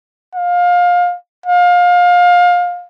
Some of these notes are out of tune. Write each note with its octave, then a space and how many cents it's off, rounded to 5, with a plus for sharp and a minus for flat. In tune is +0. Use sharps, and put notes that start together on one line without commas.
F5 +25
F5 +25